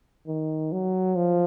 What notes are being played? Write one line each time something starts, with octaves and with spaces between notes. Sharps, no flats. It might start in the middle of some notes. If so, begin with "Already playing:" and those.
D#3
F#3
F3